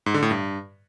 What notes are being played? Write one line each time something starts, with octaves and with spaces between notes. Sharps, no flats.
G#2
D3
A2
G2